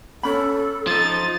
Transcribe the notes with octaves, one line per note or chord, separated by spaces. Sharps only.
C#4 A4 B5
F3 D#4 A6